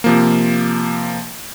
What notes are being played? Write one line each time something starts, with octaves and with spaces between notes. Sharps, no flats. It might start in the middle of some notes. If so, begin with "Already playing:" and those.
C3 F3 A#3